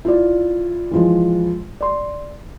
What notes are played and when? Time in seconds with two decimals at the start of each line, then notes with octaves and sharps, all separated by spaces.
0.05 E4 F4 D5
0.91 E3 F3 G#3
1.81 D5 C6